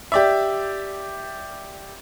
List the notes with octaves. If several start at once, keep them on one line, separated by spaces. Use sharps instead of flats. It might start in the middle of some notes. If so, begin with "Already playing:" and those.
G4 D5 E5